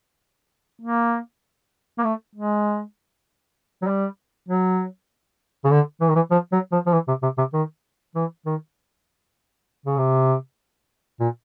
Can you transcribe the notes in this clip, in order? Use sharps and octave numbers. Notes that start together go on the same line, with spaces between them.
A#3
A#3
A3
G#3
F#3
G3
F#3
C#3
D3
E3
D#3
E3
F3
F#3
F3
F3
E3
C3
C3
C3
D#3
E3
D#3
C#3
C3
A#2